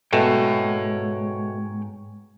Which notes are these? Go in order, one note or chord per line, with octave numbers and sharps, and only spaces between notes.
G#2 B2 A3 C#5 G5